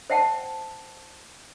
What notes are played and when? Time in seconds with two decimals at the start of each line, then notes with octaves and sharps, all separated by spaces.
0.10 C5 E5 F#5 G5 A5